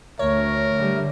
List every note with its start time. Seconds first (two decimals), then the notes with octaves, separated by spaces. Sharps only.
0.19 D2 A3 A#4 C#5
0.75 D3 G3